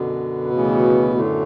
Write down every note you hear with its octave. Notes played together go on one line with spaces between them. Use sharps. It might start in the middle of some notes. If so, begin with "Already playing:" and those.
Already playing: F#2 B2 D3 B3
D2 C#3 E3
F#2 A2 D3 A3